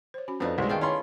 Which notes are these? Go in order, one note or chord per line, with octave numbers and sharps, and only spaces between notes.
C5 C#5
C#4 F#4 B5
F2 B3 D4 D#4 A4 D5
C2 C3 G#3 C5 D5
D#3 A3 F4 G#4 G5
C#4 E4 F4 C#5 B5 C6